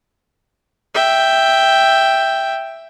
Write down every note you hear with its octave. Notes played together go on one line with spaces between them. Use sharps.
E5 G5